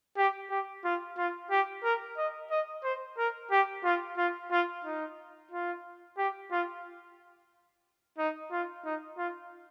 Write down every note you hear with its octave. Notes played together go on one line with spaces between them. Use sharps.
G4
G4
F4
F4
G4
A#4
D#5
D#5
C5
A#4
G4
F4
F4
F4
D#4
F4
G4
F4
D#4
F4
D#4
F4